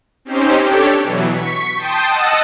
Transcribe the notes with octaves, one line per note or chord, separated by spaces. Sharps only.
C4 C#4 D#4 G4 C5
D4 G4 A4 C#5
B2 E3 F#3
C#6 B6
G5 A5 C6 D#6 G6
D#5 F#5 A5 D#6 E6